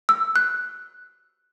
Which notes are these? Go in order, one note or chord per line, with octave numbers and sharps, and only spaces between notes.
E6
F#6